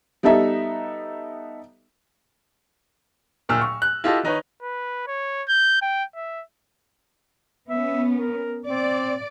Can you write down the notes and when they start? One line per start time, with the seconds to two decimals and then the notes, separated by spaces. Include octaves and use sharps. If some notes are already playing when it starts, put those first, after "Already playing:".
0.23 G3 B3 D#4 A4 E5 A#5
3.49 D1 A#2 E6 F6
3.61 C#6
3.82 F#6
4.04 E4 F4 G4 A4 D#5
4.23 D#3 D#4 B4 C#5
4.62 B4
5.07 C#5
5.49 G6
5.82 G5
6.16 E5
7.69 B3 C#4 E5
8.14 A#4
8.67 C4 D5